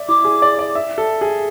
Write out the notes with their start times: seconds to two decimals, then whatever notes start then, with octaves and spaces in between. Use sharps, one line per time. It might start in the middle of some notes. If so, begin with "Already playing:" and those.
Already playing: D5 E5
0.08 E4 D6
0.25 G#4
0.42 D5
0.59 D5
0.75 E5
0.98 A4
1.21 G#4